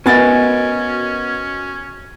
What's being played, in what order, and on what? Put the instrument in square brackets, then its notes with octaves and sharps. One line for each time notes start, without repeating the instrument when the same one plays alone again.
[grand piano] B3 [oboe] C#4 [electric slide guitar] F#4 A#4 D#5 [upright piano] G#5 A6